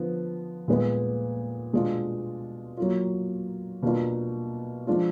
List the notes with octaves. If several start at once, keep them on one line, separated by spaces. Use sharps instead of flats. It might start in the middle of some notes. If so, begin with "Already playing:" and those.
Already playing: D3 F3 B3
A#2 G#3 B3
B2 G#3 D4 F4
F#3 A#3 F4
B2 A#3 D4 F4
F3 G#3 D4 F4